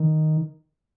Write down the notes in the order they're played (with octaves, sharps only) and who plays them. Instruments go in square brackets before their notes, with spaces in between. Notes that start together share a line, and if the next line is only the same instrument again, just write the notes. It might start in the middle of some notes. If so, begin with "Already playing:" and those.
Already playing: [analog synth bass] D#3